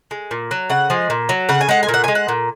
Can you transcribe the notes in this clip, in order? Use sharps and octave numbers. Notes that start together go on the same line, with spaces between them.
G#3
A#2
F#3
C#3 F#5
F3 G#3
A#2
F#3
C#3 F#5
G#5
G#3 F#5
G#5
A#2
F#5
G#3 G#5
F#5
A#2